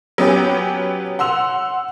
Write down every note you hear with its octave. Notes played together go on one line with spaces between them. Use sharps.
F#3 B3 C#4 G4
F#5 C6 E6 F7